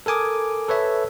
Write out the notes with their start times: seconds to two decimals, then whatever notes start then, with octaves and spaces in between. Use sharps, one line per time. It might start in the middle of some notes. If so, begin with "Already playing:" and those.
0.06 A4 A#4 G#5 D6 D#6
0.68 A4 B4 C#5 E5